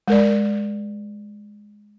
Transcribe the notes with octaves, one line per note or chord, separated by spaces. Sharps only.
G#3 A#4 D5